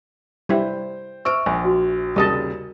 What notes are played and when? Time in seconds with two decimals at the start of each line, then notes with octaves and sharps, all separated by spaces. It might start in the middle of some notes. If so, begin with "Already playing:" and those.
0.49 G3 E4 C5 G5
1.25 C5 E5 C#6 E6 F6 D7
1.46 A#1 G#5
1.64 F#4
2.16 D#2 C#3 G3 A#4 D#5 A5